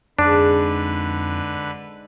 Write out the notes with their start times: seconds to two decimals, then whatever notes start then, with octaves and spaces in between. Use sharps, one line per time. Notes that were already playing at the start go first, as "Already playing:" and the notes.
0.19 F2 G#2 D3 D4 B4 D5